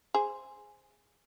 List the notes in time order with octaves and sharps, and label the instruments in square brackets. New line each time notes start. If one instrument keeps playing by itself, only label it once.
[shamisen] G#4 C5